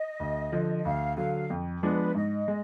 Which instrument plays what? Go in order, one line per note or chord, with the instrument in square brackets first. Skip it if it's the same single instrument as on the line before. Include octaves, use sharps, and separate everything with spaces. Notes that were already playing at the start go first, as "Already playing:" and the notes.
Already playing: [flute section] D#5
[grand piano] D2
D3 F3
[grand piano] D2 [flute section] F5
[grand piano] D3 F#3 [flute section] F5
[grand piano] F2
[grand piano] F3 G#3 B3 D4 [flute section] B4
[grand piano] G#2 [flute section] D#5
[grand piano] G#3